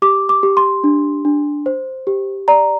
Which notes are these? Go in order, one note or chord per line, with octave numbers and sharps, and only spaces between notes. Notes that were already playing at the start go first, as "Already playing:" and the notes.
G4 D6
D6
G4
C6
D4
D4
C5
G4
D5 A#5